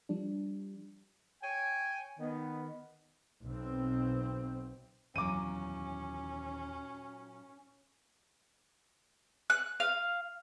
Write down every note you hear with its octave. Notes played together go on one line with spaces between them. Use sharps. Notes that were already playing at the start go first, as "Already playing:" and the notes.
F3 G3 D4
C#5 G5 G#5
D#3 B3
B1 B2 C4
D#2 A#2 E3 F#3 C#4 D6 D#7
F#6
F5